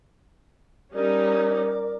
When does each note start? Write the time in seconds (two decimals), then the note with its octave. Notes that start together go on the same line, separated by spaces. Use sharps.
0.93 G3 C#4 D#4 A#4 D5 D6